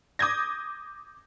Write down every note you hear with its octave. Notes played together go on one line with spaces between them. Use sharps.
D6 D#6 G6 G#6 A#6